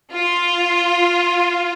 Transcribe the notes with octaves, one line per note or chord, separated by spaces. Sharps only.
F4